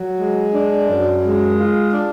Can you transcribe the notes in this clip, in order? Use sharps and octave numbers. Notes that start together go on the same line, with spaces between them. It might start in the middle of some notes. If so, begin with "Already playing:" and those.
Already playing: F#3
G#3
D4
F#2
G#3
F4
D4